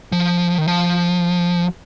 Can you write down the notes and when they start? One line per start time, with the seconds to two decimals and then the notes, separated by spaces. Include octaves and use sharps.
0.12 F3
0.58 D#3
0.67 F3